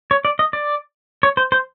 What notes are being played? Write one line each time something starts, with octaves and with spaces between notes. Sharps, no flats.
C#5
D5
D#5
D5
C#5
C5
C5